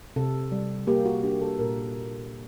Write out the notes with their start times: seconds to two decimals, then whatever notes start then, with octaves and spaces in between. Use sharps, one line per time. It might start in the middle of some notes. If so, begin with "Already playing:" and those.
0.16 C3 A4
0.52 G3
0.87 A#3 G4
1.06 F#4
1.23 D4 G4
1.42 A4
1.59 A#2 A#4